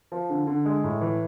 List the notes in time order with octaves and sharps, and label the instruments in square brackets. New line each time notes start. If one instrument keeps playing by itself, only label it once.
[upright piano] F3
D3
D3
G#3
A2
E3